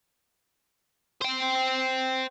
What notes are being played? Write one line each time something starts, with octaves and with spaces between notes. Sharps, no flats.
C5 G5